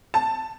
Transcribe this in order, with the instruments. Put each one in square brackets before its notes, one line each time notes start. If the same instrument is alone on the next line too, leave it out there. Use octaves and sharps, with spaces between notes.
[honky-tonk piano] A5